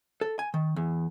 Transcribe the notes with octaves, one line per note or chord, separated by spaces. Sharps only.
A4
G#5
D#3
E2